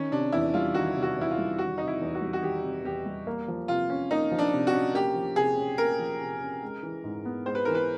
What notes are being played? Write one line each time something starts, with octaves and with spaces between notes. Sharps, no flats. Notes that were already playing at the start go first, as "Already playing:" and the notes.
Already playing: D#3 C#4
C3 D4
E2 E4
G3 F4
D#3 F#4
C3
F#4
E2 E4
F4
G3
D#3 F#4
C3 D#4
E4
E2
F#4
G3
F#4
D#3 G4
C3
E2 G4
G3
A#3
F3
C3 F4
C#4
A#3 D#4
F3
D4
C3
F#4
C#4
A#3 G4
F3
C3 G#4
C#4
A#3 A#4
F3
C3
C#4
G#3
E3
G#2
B3
G#3 C5
B4
E3 A#4
B4